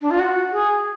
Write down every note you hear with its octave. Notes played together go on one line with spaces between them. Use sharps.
D4
F4
F#4
G#4